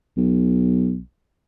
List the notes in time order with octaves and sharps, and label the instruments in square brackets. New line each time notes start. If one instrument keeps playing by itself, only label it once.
[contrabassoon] B1